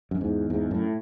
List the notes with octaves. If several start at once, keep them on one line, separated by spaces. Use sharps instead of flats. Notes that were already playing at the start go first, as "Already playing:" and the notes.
F#2
E2 G#2
E2 G#2
F#2 A2